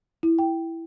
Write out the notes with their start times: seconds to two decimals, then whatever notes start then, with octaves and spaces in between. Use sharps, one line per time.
0.23 E4
0.39 G5